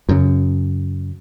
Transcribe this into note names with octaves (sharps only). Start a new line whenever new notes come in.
F#2 C#3